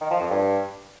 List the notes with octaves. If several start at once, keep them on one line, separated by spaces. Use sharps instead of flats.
D#3
F3
F2
G2